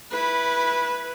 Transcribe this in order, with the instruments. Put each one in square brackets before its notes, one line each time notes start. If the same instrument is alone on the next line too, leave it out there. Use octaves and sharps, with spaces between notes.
[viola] E4 B4